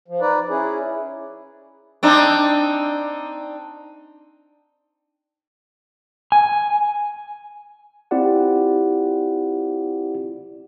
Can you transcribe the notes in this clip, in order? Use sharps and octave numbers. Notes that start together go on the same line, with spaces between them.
F3
D#4 B4 D5
C#4 E4 G#4
C4 D4 D#4
G#5
C4 E4 F4 G4 D5 F#5